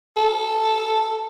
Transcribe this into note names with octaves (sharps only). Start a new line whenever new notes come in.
A4